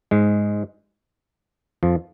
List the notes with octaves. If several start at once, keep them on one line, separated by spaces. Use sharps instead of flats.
G#2 G#3
F2 F3